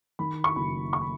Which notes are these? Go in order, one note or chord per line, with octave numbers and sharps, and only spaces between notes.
D#3 B5
C#6
F#1 B5
C#6
B5